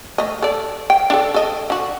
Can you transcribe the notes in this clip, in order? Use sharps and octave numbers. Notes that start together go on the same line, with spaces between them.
A3 D#5
A4 D5
G5
D4 F4 A4
A4 D#5
D3 F#4